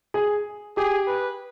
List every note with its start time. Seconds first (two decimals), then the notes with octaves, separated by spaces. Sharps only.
0.14 G#4
0.77 G4 G#4
1.07 B4